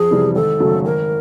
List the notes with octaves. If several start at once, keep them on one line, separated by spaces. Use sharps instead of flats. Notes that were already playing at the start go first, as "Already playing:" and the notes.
Already playing: F2 G#4
C3 E3 G3
G#1 A4
F#2 C#3 F#3 A3
G#1 A#4